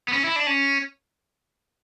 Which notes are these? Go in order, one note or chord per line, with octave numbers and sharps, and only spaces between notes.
B3
C#4
E4
D4
C#4